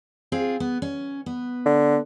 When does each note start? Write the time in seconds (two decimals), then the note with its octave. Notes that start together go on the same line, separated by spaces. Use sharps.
0.32 C4 F4 G#4
0.60 B3
0.82 C#4
1.26 B3
1.66 D3